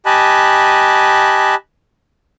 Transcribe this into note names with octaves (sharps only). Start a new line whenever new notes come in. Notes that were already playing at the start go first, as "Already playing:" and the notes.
G4 D#5 G#5 A5 B5 F#6